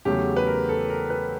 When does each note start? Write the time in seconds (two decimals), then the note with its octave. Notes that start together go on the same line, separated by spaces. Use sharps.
0.05 E2 C#3 F#3 A3 G4
0.36 B4
0.47 A#4
0.69 A4
0.90 A#4
1.10 B4